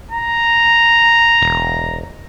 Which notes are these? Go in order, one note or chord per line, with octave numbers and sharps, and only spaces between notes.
A#5
E1